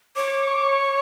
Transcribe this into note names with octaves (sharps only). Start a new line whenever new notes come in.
C#5 D6
D6
C#6
D6
C#6